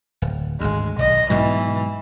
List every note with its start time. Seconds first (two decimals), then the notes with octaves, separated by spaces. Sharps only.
0.22 D1
0.60 G#1 D2 G#3
0.99 B1 D#5
1.30 G#2 B2 E3 F#3